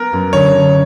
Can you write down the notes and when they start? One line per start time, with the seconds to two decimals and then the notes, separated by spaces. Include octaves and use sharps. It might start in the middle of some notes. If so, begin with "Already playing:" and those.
Already playing: B3 A#4
0.13 F#2
0.33 D3 C#5
0.54 D3